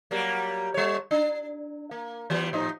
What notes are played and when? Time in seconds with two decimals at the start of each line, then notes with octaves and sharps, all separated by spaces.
0.11 F#3 G3 A#3
0.74 G3 C#5
1.11 D4
1.91 A#3
2.30 E3 G3 B3
2.53 A2 F3 D#4